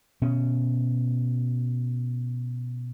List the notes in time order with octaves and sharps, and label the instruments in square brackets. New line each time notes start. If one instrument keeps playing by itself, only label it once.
[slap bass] B2 C#4